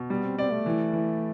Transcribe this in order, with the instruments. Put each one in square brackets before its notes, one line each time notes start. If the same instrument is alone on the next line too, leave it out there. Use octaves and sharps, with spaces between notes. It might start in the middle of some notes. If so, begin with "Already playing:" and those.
Already playing: [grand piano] B2
[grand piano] G3 [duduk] B3
[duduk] C4
[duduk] C4 [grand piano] D5
[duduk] A3
[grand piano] E3
E3